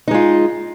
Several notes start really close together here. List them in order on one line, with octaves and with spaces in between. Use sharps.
D#4 G#3 F4